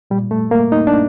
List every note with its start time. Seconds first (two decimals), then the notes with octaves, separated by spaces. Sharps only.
0.11 A#2 G3
0.31 A3
0.51 A#3
0.72 D#4
0.87 D4